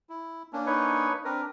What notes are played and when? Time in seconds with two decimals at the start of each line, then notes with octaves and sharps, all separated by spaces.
0.09 E4
0.53 A#3 C#4 D4
0.66 D#4 B4 C#5
1.25 C4 D4 A#4 B4